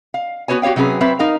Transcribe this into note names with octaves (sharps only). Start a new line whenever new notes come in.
F5
B3 F#4 G4 B4 C#5 G#5
F#4 G4 C#5 F5 G5
C3 F#3 C#4 G#4 B4
F#3 C4 B4 E5
D#4 A#4 F5